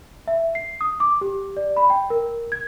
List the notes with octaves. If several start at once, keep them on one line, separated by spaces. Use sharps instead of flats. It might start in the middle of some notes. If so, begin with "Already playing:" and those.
E5
C7
D#6
D6
G4
D5
B5
G5
A#4
G#6